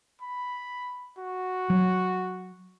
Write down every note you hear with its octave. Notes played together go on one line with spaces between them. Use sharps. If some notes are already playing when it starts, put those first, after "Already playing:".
B5
F#4
F#3